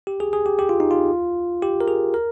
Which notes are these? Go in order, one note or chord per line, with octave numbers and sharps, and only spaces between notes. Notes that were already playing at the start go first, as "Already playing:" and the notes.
G4
G#4
G#4
G4
G4
F4
D#4
F4
G4
A#4
G#4
A#4